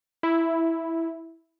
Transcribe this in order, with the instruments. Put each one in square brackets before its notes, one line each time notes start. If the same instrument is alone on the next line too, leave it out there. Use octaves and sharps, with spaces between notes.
[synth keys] E4